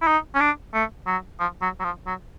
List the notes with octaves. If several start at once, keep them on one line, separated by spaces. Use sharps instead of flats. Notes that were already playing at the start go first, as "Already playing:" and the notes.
E4
D#4
C#4
D4
A3
F#3
F3
F#3
F#3
F3
F#3